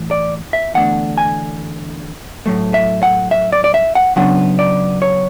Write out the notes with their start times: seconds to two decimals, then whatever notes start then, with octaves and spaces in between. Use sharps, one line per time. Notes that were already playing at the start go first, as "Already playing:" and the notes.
Already playing: A2 E3
0.11 D5
0.53 E5
0.74 E2 D3 A3 D4 F#5
1.18 G#5
2.46 A2 F#3 A3
2.74 E5
3.03 F#5
3.31 E5
3.52 D5
3.64 D5
3.74 E5
3.95 F#5
4.16 C#3 F#3 B3 D4 F#5
4.59 D5
5.02 C#5